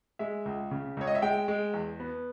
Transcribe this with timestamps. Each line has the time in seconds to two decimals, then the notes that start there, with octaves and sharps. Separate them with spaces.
0.19 G#3 E5
0.46 C#2
0.71 C#3
0.97 C#2 C#5
1.07 D#5
1.15 E5
1.22 G#3 G5
1.48 G#3
1.74 E2
2.00 B3